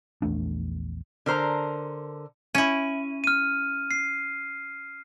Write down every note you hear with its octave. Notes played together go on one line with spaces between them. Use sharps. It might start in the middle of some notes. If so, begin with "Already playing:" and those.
A#1 E2 A3 D4
D3 A#4 C5 A#5
C#4 E4 D#7
F6 D#7
C7